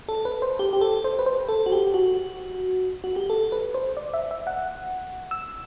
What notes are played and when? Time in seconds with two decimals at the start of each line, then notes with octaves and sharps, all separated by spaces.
0.09 A4
0.25 B4
0.42 C5
0.59 G4
0.73 G4
0.81 A4
1.04 C5
1.19 B4
1.26 C5
1.49 A4
1.66 F#4
1.72 G4
1.94 F#4
3.04 F#4
3.16 G4
3.30 A4
3.52 B4
3.74 C5
3.97 D5
4.14 E5
4.31 E5
4.47 F#5
5.31 E6